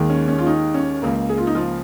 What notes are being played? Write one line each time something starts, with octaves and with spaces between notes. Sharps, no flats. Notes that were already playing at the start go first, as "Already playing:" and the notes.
Already playing: D#2 D#3 G#3
C#4
C#4
F4
D#4
C#4
C#2 C#3 A#3
G#4
F4
D#4
F3 F4